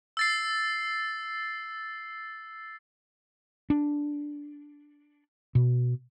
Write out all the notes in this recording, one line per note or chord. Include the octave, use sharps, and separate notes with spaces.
E6 A6 C7
D4
B2